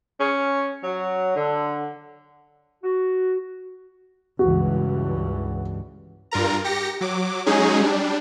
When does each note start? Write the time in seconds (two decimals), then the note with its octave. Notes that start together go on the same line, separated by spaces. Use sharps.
0.21 C#4
0.84 F#3
1.35 D3
2.84 F#4
4.39 C#2 G2 E3 F#4
6.31 G2 F4 A#4 A#5
6.64 G4 A#6 C#7
7.01 F#3 D6
7.46 F#3 G#3 C#4 D#4 G#4
7.80 G3 D4